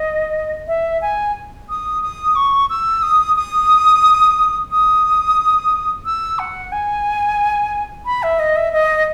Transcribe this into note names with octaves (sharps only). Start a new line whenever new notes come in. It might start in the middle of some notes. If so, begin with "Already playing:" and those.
Already playing: D#5
E5
G#5
D#6
D#6
C#6
E6
D#6
D#6
D#6
E6
F#5
G#5
B5
E5
D#5
E5
D#5